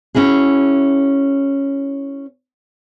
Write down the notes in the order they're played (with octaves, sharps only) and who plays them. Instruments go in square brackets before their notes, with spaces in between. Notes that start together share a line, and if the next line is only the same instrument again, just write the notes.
[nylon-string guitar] C#4 E4 F#4 G#4